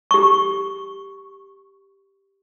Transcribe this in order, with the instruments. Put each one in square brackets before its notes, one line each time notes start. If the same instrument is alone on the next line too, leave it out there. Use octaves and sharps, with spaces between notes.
[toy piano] G4 C#6